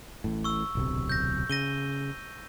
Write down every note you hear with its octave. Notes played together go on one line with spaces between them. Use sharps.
A1 A2
C#6 E6
D1 B1 C3
G6 A#6
C#3 A#6 D#7 G7